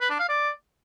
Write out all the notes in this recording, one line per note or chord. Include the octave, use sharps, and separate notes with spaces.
B4
D4
F5
D5